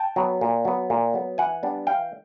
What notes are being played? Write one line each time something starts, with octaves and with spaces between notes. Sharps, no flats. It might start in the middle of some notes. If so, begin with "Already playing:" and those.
Already playing: G5 A5
F#3 B3
A#2
F#3 B3
A#2
F#3 B3
E3 F#5 G#5
G3 B3 D4
E3 F5 G5